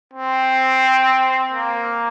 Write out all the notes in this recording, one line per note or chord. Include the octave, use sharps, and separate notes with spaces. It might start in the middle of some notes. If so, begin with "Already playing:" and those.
C4
A#3